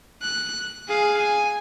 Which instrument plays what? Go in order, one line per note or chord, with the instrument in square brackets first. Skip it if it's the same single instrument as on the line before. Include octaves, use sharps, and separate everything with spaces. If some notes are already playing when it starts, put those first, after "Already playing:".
[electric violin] F#6
G#4 F5
G#5